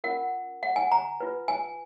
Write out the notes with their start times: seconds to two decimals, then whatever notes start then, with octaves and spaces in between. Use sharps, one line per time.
0.04 C#4 F4 A#4 F#5
0.63 F#5
0.76 G#5
0.92 A#5
1.20 F4 B4
1.48 G#5